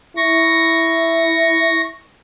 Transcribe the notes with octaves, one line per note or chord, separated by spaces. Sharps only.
E4 C#6 A#6